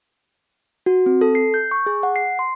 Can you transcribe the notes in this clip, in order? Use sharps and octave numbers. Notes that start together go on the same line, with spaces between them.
F#4
C4
A4
C7
G6
C#6
G#4
F#5
C7
C6